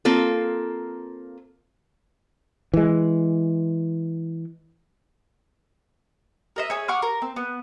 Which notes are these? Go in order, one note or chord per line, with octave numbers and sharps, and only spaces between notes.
A#3 C4 F4 A4
E3 G#3
A#4 D#5 E5
G#4 C#5
F#5 C#6 D6 F6
A#4
C4
B3